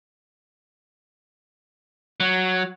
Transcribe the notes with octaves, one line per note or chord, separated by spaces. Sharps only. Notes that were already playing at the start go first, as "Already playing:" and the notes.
F#3